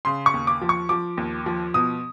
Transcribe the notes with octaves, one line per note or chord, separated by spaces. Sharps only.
C#3 C6
C#6
D#2
D6
F3
C#6
F3 D6
D#2
F3
B2 D#6